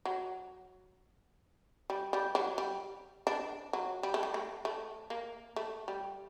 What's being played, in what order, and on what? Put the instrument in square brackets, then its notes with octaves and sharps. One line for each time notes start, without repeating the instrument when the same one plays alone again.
[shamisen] F#3
G3
G3
F#3
G3
D4
F#3
G3
A3
G3
A3
A3
A#3
A3
G3